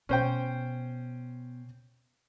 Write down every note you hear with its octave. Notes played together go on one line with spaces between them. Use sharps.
B2 C#4 C5 G5